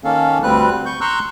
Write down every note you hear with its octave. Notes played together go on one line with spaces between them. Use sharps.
D#3 A#3 C#4 A4 F5
D2 G3 C4 B4 F#6
C#6 G6
A#5 C6 C#6 E6 F#6